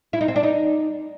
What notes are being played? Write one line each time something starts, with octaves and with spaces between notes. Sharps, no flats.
E4
D#4
C4
D4
D#4